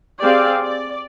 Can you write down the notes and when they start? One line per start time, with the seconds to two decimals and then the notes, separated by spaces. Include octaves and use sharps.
0.21 C4 G4 G#4 D5 F5
0.63 D5